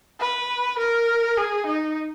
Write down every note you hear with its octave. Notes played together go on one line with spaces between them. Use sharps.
B4
A#4
G#4
D#4